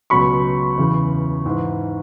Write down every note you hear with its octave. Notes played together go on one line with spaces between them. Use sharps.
C#2 B2 F#3 B5 C#6
E2 C#3 E3
G#2 E3